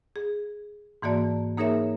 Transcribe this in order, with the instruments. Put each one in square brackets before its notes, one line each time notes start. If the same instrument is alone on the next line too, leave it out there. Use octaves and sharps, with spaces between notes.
[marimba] G#4
G#2 E3 A#3 F#4 D5 A5
A#3 D#4 G#4 A#4 C#5 E5